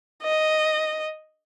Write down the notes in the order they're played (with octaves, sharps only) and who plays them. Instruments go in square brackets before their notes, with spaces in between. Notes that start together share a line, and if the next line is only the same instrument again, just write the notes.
[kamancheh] D#5